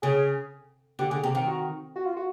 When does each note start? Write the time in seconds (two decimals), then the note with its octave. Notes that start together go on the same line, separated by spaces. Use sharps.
0.02 C#3 G#4
0.99 D3 G4
1.11 D3 G#4
1.23 C3 G4
1.35 D#3
1.47 F#4
1.96 F#4
2.05 F4
2.16 F#4